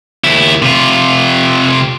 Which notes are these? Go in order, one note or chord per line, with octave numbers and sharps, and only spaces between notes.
D#2 E4
C3 F4